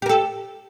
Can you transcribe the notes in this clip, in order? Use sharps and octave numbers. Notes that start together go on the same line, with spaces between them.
G4 A4 A#4